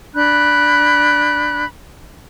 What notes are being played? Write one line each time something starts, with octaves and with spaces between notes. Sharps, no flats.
D4 B5 F#6 G6